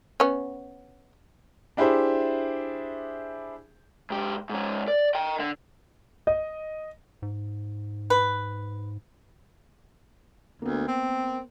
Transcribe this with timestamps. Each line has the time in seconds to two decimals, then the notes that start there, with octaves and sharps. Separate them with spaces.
0.20 B3 C#4
1.77 D4 E4 G4 G#4 C5 E5
4.10 G#2 G4
4.50 G#2 C#4
4.88 D5
5.15 D#5 G5
5.40 D3
6.27 D#5
7.22 G#2
8.10 B4
10.62 D2 A#3 B3
10.88 C4